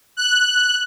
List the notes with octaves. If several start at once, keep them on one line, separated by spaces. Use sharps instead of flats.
F#6